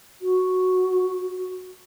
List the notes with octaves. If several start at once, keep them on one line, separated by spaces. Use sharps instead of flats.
F#4